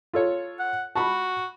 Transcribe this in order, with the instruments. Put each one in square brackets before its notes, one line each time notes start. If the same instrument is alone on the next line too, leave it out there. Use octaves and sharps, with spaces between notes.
[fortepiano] F4 A4 C#5
[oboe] F#5
[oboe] F#4 [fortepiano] A5 B5